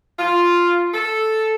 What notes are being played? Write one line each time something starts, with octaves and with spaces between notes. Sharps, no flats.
F4
A4